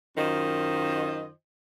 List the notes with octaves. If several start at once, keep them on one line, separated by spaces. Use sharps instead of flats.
F#2 D#3 F4 C5 D#5